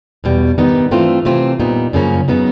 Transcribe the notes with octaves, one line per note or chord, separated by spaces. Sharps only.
E2 B2 G3
G2 D#3 G3 B3 D#4
G2 E3 A3 C4 F4
C3 E3 A3 C4 F4
A#2 G3 B3 D#4
F#2 C#3 F3 A#3 C#4
C#3 F#3 B3 D#4